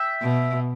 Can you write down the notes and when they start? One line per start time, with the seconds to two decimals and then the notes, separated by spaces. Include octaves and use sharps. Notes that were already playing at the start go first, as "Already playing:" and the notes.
Already playing: E5 G5
0.22 B2